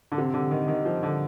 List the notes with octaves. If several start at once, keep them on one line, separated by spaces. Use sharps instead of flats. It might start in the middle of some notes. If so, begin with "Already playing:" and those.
D3
C3
D3
D#3
D#3
F3
D3